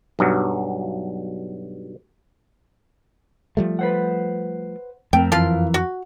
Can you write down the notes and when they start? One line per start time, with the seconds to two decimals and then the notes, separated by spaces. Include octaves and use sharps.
0.19 B1 G2 F#3
3.57 F3 G3 A3
3.79 B4 C5 F#5
5.13 F2 A3 C4 A#4 G5
5.32 F#2 E3 F3 F4 A#4 C6
5.74 F#4